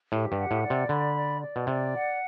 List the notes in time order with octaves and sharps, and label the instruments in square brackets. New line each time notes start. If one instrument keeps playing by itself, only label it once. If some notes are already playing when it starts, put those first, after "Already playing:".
[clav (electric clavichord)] A2 [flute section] G4
[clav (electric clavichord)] G2
[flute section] F#5
[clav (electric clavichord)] A2
[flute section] D5
[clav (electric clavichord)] C3
[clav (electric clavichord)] D3 [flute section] B5
[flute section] D5
D5
[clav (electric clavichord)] B2
[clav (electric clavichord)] C3 [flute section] D5
[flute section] F#5